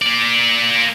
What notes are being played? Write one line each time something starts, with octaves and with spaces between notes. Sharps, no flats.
A#3 D5